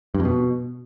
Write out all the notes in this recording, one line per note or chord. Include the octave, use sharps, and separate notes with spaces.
G2
F2
B2